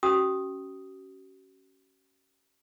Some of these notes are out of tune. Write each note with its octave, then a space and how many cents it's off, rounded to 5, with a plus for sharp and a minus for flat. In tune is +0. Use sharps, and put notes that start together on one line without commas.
C#4 +0 F#4 +40 D#6 +0